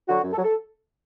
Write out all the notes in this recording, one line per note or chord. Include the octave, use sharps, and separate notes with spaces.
D3 F#3 F#4
F#2
A4
F#3
A4